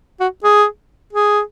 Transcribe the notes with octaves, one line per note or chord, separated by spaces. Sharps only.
F#4
G#4
G#4